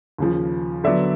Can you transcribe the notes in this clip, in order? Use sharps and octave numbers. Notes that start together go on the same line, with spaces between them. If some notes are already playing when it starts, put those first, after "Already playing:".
D#2 C#3 F3
D3 F#3 B3 D5 E5